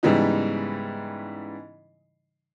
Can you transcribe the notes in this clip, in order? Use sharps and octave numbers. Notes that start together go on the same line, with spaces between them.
G#2 C#3 E3 G3 B3 D#4